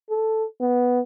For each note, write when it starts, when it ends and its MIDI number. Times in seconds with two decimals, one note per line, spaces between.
0.10 0.45 69
0.61 1.00 59